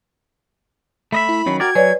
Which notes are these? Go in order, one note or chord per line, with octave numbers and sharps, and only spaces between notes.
A3 D#5 E5 B5
E4
D#3 F#3 C#4
F#4 A#4 D5 G5 D6 G#6
F#3 B4 C#5 D5 G#5